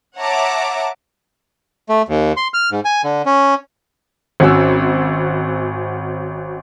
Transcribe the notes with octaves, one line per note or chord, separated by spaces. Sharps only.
C#5 E5 F#5 A5 A#5 D6
A3
D#2
C6
F6
G#2
G#5
D3
C#4
G#1 C#4 F#4 E6